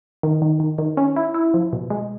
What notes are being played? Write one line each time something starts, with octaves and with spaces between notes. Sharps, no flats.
D#3
D#3
D#3
D#3
C#4
E4
E4
F3
B2
G#3